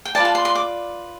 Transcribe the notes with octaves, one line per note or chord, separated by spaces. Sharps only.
G5
F4 B4 D5 A5
A5
C6
C6
D6